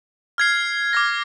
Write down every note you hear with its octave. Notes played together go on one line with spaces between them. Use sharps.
F6 G#6 C7
D6 F6 A#6